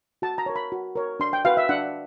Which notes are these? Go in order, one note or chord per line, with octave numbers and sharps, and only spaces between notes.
F#4 A5
A#5
A#4 C#5
B5
F#4
A#4 C#5
D4 C6
G5
F#4 B4 F5
E5
D4 F#5